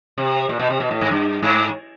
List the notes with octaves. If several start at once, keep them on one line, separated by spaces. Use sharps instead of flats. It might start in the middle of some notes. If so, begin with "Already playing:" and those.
C3
A#2
B2
C3
B2
A2
G#2
G2
G#2